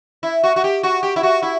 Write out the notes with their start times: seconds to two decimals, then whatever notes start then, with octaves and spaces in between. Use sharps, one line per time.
0.23 E4
0.44 F#4
0.56 F#4
0.64 G4
0.83 F#4
1.03 G4
1.16 E4
1.23 F#4
1.42 E4